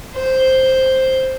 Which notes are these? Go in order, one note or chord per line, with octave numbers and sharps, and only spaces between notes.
C5